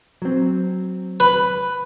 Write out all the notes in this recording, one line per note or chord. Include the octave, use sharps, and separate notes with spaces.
F#3 C4
B4